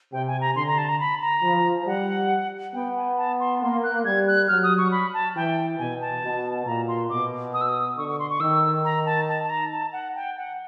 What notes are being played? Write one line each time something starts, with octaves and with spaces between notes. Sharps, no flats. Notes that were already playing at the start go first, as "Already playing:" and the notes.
C3 G5
G#5
A#5
D3 C6
A#5
A5
A#5
B5
A#5
F3
G3 F#5
B3 G5
G#5
A5
C6
A#3 C6
F#6
G3 G#6
F#6
F#3 F6
D#6
C#6
B5
A5
E3 G5
B2 G#5
A5
B2
A#2 A#5
C6
B2 D6
D#6
E6
D#6
D3 C#6
C#6
C6
C#6
D#3 E6
A#5
A5
A5
A5
A#5
A5
F#5
G5
F#5